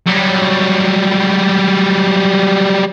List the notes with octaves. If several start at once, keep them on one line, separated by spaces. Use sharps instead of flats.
F#3 G3